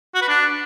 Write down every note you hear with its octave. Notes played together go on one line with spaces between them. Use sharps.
F#4
B4
D4